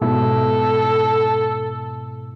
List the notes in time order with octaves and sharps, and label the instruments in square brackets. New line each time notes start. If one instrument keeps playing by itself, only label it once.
[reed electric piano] G#2 B2 E4 [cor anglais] A4